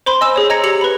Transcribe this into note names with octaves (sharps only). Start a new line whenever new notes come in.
C5 B5 C6
D#5 G#5 E6 E7
G#4 C#5
D#5 A#5 G#6 A#6 C#7
G4 C#7 F7 F#7
B4 B5